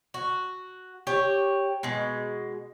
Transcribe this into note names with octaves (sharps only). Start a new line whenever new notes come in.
F#4
G4 C#5
B2 G#3